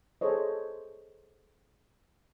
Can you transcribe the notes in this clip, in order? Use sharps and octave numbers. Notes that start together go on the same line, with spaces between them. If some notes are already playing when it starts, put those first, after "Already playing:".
G#4 A4 C5 C#5 D#5